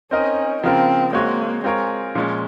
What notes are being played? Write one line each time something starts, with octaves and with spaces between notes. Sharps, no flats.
C4 C#4 D#4 A#4 D#5
C#3 F3 A#3 C4 F4 A#4
G#3 A#3 C4 F#4 C#5
G#3 C4 F4 A#4 C#5
A#2 F3 G#3 C#4